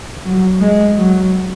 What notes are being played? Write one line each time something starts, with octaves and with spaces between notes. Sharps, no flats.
F#3
G#3
F#3